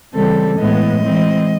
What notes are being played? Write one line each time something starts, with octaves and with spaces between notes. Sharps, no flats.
C#3 E3 G3 C4 A4
A2 E3 G#3 B3 D#5
E3 G#3 C4